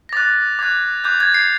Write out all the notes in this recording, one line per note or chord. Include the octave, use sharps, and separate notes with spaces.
A#6
D6 F#6 A6
D6 F#6 G#6
D6 F#6 G6
G#6
C7